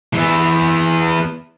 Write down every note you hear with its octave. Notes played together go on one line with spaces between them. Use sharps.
E3 B3